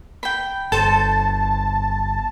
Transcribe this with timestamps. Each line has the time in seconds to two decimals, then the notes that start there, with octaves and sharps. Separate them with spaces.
0.23 G5 B5
0.72 G1 A4 C5 A5